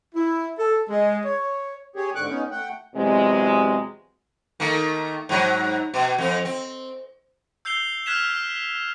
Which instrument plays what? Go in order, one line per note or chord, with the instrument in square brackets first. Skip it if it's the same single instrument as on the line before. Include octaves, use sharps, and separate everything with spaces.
[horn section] E4
A4
G#3
C#5
[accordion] G4 G#4 C#5
G#2 D3 C#6 D6 F#6
B3 C#4 D#4
A3 F#5 G5
[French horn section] E2 C3 F#3 G#3
[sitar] D#3 A3 A#3
G#2 F#3
B2
F2 C4
C4
[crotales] E6 G6 C7 F7 G7
F6 F#6 G#6 B6 E7 F7